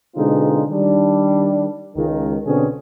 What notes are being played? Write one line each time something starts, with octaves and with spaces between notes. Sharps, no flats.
B2 D3 G#3 C4 D#4 F4
D#3 G3 D4
C#2 D#3
B2 D3 C4 C#4 G#4